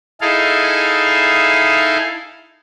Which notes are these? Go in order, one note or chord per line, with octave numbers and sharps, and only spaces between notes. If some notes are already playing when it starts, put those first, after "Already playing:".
D#4 E4 G#4 A4 F5